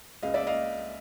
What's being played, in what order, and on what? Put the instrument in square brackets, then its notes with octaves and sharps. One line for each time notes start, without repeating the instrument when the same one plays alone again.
[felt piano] C#2 D#5 F5
D5 E5
D#5 F5